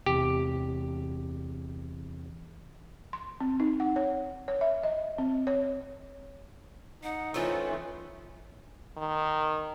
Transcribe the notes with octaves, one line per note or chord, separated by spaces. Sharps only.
E2 C3 G4
C6
C4
D#4
F#5
C#5
C#5
E5
D#5
C4
C#5
D#4 F#5
E3 A3 C4 C#4 F4
D#3